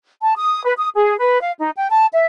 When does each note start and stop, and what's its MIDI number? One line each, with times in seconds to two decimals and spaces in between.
0.22 0.33 81
0.36 0.62 87
0.64 0.73 71
0.78 0.89 87
0.96 1.16 68
1.19 1.40 71
1.41 1.51 77
1.57 1.70 63
1.77 1.88 79
1.90 2.06 81
2.12 2.26 76